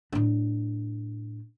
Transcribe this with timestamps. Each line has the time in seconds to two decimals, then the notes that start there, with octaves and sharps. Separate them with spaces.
0.12 A2 D4